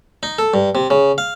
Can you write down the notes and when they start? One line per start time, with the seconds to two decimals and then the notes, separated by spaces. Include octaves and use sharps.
0.23 D#4
0.38 A4
0.54 G2
0.75 C3
0.90 C#3
1.18 F5